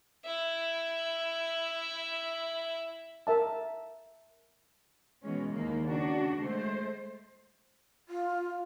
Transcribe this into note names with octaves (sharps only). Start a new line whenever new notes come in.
E4 E5
A#4 E5 A5
B2 E3 G#3 C#4
D#2 G#3 A#3
C#3 D4 F#4
G#3 A3 C5
F4